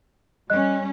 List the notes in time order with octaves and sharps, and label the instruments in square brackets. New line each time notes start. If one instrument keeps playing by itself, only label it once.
[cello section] G3 C#4 [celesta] D#5 F#6